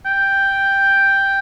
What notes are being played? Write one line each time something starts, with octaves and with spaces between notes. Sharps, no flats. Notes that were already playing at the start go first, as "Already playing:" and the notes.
G5